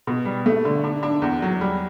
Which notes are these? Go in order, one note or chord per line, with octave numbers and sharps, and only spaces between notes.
B2
G3
A3
D3
D4
D4
E2
F#3
G3